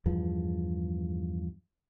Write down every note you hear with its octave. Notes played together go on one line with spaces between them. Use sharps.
E2 G2 F3